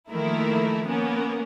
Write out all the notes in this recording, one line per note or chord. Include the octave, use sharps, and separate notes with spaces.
D#3 F3 A3 A#3 E4 A#4
A#3 B3 C#4 A#4